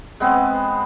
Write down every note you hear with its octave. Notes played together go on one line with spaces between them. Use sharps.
G#3 B3 C4